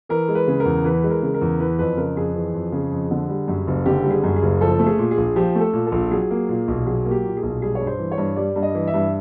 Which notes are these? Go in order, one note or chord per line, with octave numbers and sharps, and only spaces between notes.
E3 A#4
G#3
B4
C#3
A#4
E2
E3 B4
G#3
A#4
C#3
A#4
E2
E3 B4
F2 B4
C#3 A#4
F2 G#4
E3
F2
C#3
F2
D3
G3
F#2
F#1
D3 G4
G3
G#4
F#2
G#4
F#1
F3 A4
A3
G#4
A#2
G#4
A#1
F3 G4
A3
A4
A#2
A4
A#1
F#3 G#4
A#3
A#2
B1
F#3 G#4
A#3
G4
A#2
G#4
B1
G3 G#4
G2 C#5
C5
E3
C#5
G2
G3 D5
G2
D#5
E3
E5
G2